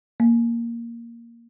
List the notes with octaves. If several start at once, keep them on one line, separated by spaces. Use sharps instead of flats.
A#3